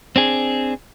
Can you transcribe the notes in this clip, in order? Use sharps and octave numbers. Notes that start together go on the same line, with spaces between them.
C4 D4 G#4